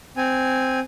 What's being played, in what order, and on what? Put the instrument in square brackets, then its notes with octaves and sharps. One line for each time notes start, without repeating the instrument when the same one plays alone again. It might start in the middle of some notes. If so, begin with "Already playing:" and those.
[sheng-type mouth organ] C4 G#5